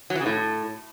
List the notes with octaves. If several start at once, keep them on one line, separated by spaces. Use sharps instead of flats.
F#3
E3
C#3
A2